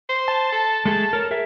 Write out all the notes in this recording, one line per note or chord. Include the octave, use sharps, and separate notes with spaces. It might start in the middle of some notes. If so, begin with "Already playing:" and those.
C5
A5
A4
G#3 A3 G#4 A4
A#4 C#5
G#4 A#4 E5